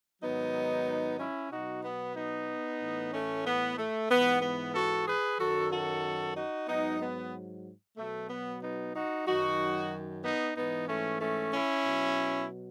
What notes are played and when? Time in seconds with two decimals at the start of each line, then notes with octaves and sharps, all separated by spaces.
0.22 G#2 D#3 F#3 B3 D#4
1.20 C#4 E4
1.51 B2 F#3 D#4 F#4
1.84 B3
2.16 B3 D#4
2.81 A2 E3
3.13 A3 C#4
3.46 B3
3.78 A3
4.10 G#2 E3 B3
4.42 B3
4.74 F#4 A4
5.07 G#4 B4
5.39 F#2 D#3 F#3 F#4 A4
5.72 F#4 A4
6.36 D#4 F#4
6.68 G#2 F#3 B3 D#4
7.01 B3
7.98 B2 F#3 A3
8.30 B3
8.62 B3 D#4
8.95 D#4 F#4
9.27 F#2 D#3 F#3 D#4 F#4
10.23 B3 D#4
10.56 G#2 E3 B3 D#4
10.89 A3 C#4
11.21 A3 C#4
11.53 C#4 E4
11.85 B2 F#3